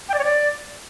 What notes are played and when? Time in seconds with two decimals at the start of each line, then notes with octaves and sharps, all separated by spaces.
0.09 G5
0.14 D5
0.19 C#5
0.24 D5